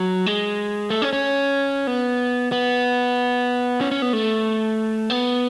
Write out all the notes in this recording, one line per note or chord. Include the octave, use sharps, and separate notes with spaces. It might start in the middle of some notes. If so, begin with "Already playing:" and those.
Already playing: F#3
G#3
A3
C#4
C#4
B3
B3
C#4
C#4
B3
A3
B3